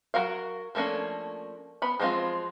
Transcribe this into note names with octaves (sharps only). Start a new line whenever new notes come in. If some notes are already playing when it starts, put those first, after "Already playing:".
F#3 F#4 A#4 F5
F3 A3 A#3 C#4 D4
B3 B5
F3 F#3 G#3 C4 F4